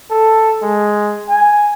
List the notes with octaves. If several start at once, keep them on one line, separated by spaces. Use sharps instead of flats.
A4
G#3
G#5